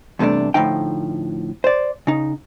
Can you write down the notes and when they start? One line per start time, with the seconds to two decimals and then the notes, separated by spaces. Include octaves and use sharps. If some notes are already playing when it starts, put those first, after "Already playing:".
0.19 E2 G2 C3 A3 D4
0.54 A2 D3 F3 D#4 G5
1.64 C5 D5
2.07 C#3 D#4